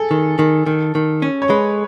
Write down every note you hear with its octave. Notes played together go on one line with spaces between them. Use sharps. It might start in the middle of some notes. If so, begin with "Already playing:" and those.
Already playing: G#4 A4
D#3
D#3
D#3
D#3
C#4
C#5
G#3 B4